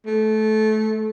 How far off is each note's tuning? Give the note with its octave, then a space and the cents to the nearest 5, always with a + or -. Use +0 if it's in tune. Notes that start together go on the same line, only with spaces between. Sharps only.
A3 -20